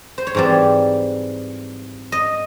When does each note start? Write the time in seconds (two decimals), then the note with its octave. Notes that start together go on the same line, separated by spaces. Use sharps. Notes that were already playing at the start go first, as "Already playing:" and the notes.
0.18 C5
0.27 C#5
0.35 G#2 E3 G3 C4 D5
2.12 D#5